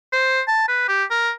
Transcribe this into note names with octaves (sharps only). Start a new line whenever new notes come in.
C5
A5
B4
G4
A#4